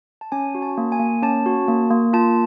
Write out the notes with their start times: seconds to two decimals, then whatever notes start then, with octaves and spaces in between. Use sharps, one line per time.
0.21 A5
0.32 C#4 G#5
0.55 F#4
0.62 A5
0.78 A#3
0.92 G#5
0.99 A#3
1.23 C#4 A5
1.46 F#4
1.68 A#3
1.91 A#3
2.13 F4 A5